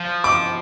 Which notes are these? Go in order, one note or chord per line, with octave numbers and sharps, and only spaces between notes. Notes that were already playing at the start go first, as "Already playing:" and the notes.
Already playing: F3
D6